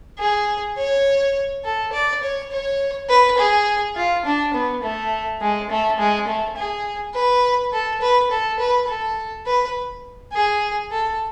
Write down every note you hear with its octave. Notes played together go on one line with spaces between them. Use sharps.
G#4
C#5
A4
D5
C#5
C#5
B4
G#4
F4
D4
B3
A3
G#3
A3
G#3
A3
G#4
B4
A4
B4
A4
B4
A4
B4
G#4
A4